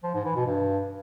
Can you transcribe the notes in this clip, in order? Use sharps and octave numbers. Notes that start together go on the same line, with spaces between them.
F3
G#2
E3
B2
G2